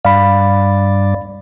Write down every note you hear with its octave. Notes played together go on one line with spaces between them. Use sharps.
G2 D5 F5 B5